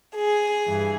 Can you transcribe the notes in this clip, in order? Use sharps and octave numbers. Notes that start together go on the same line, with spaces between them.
G#4
G2 E3